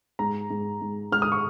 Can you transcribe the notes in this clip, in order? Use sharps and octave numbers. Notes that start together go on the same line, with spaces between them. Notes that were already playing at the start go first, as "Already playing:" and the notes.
G#2 A#5
G#2
G#2
G#2 F6
D#6
C#6